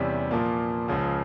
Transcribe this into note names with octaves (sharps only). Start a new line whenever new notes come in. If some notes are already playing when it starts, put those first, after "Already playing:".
Already playing: E2 C3 G3 C#4
A#2 F3 A#3
C#2 C#3 F3